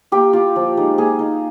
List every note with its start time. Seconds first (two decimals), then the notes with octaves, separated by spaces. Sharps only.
0.12 A#3 G4
0.33 F4
0.56 F3
0.77 G#3 D#4
0.98 A#3 G#4
1.19 D#4